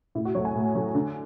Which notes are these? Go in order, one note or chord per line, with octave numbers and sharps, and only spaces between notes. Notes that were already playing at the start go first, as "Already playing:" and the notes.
A2 E4
F#4
F#3 A3 C#5
G#5
A2
F#3 A3
D3